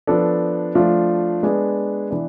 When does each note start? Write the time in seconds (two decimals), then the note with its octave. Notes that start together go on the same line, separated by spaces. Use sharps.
0.07 F3 B3 D4 A4
0.75 F3 A3 D4 F4
1.43 G#3 B3 D4 G#4
2.11 E3 B3 D4